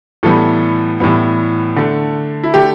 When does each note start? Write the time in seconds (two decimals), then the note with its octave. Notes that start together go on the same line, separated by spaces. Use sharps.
0.23 A2 E3 G3 B3 A4
1.00 A2 E3 G3 B3
1.76 D3 A3
2.43 E4
2.54 D3 A3 G4